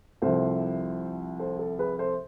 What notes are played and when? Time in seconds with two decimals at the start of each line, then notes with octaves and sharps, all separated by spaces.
0.22 C2 C3 F3 A4 C5
1.39 A4 C5
1.59 A4
1.79 G#4 B4
1.99 A4 C5